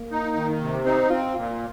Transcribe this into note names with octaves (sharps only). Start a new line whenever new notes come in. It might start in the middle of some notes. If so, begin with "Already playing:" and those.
Already playing: A#3
D#4
D#3
C3
C4 D#4
C4 F4
A#2 F4